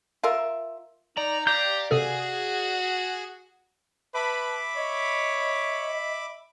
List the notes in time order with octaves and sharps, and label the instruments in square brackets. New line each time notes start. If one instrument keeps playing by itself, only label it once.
[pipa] F4 A#4 E5
[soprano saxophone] D#4 [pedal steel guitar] D5 [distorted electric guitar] A#5
[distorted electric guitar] G4 [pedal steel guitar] D5 F5 G6 [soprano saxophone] A#5
[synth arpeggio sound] C3 A4 [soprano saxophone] F#4 [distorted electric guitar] G#4
[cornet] B4 [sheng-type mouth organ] E5 B5 D6 [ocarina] A5
[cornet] C#5 [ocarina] D#5